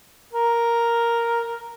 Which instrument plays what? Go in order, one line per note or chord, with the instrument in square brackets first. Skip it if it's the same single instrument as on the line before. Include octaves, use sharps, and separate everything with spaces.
[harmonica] A#4